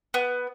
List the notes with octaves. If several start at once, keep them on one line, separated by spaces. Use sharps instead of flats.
B3